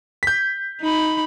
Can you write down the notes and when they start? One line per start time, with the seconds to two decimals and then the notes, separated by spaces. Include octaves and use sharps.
0.23 G6 B6
0.81 D#4 B5